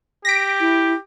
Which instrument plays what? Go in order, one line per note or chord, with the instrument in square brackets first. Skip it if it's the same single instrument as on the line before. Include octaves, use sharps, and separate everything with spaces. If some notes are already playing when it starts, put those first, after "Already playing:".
[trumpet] G4 [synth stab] A#6 B6 D7
[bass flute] E4